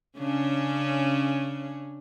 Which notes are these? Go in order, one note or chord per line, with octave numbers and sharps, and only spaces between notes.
C#3 C#4 D4